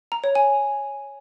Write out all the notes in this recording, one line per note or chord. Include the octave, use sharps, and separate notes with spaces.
A#5
C#5
G#5